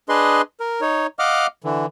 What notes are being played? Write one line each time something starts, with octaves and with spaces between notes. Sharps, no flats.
D4 G#4 B4 D#5 C6
A#4
D#4 C#5
D#5 F5 F#5 D6 F6
D3 E3